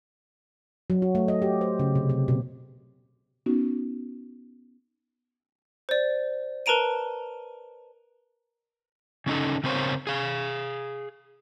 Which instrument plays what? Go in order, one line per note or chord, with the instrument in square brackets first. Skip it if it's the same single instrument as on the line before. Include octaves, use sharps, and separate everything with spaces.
[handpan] F#3
F#4
A3
D#5
G4
C5
C#3
C3
C3
B2
[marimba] B3 C#4 D#4 F#4
[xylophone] C5 D5
A#4 B4 A5 A#5 D7 D#7
[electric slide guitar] C#3 C#4 D#4 A4
C#3 C4 A#4 C5 C#5 F5
G#4 F5